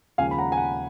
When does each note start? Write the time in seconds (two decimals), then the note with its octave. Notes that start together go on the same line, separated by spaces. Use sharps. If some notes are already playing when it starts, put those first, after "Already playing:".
0.18 D#2 C#3 F3 G#3 F5 G#5
0.31 B5
0.38 F#5 A#5
0.52 G#5
0.57 F#5